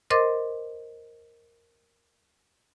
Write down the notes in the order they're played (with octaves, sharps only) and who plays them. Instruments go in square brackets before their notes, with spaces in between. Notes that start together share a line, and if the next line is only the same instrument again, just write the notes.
[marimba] A#4 C5 D#5 C6 D6 A6